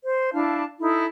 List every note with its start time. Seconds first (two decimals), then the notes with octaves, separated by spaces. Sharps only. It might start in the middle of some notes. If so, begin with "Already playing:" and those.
0.03 C5
0.32 D4 E4 F5 A5
0.80 D#4 E4 A4